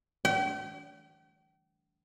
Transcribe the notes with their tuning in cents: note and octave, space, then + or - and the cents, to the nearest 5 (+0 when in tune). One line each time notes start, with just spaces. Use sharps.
G5 -40